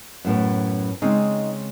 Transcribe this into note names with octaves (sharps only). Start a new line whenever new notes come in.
F#2 A2 B3
C#3 G#3 C4 D#4